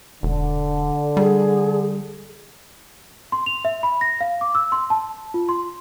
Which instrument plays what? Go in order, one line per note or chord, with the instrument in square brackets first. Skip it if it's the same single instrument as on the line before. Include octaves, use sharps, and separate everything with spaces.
[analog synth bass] E1 [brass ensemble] D3
[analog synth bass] G3 [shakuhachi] G#4
[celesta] C6
F7
E5
B5
A#6
F5
D6
E6
C6
A5
F4
C6